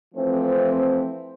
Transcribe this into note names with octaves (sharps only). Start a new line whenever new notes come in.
E3 F3 A3 C4